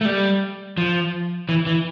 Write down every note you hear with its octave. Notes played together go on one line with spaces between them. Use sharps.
A3
G3
F3
E3
E3